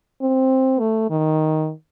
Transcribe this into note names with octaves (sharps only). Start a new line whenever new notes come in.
C4
A3
D#3